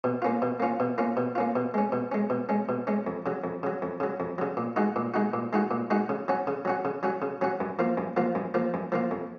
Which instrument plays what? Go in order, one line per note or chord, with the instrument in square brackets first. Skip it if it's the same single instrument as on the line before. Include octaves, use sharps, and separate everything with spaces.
[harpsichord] B2
A#3 C#4 F4
B2
A#3 C#4 F4
B2
A#3 C#4 F4
B2
A#3 C#4 F4
B2
G#3 C#4
B2
G#3 C#4
B2
G#3 C#4
B2
G#3 C#4
F2
C#3 F#3
F2
C#3 F#3
F2
C#3 F#3
F2
C#3 F#3
A#2
G#3 D#4 F#4
A#2
G#3 D#4 F#4
A#2
G#3 D#4 F#4
A#2
G#3 D#4 F#4
C#3
F#3 C#4 F#4
C#3
F#3 C#4 F#4
C#3
F#3 C#4 F#4
C#3
F#3 C#4 F#4
F#2
F3 A#3 F4
F#2
F3 A#3 F4
F#2
F3 A#3 F4
F#2
F3 A#3 F4
F2